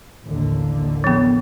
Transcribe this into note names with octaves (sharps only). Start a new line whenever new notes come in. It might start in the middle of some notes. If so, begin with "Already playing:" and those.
A1 D#2 D3
F3 B3